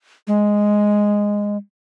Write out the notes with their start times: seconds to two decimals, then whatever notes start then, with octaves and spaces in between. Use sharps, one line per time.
0.28 G#3